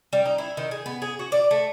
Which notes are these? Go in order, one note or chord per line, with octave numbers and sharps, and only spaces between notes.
G3
D#4
E4
D#3
G#4
B3
G#4
F#4
D5
A3